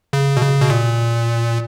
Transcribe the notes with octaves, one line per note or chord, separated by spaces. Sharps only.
C#3
B2
C#3
B2
A#2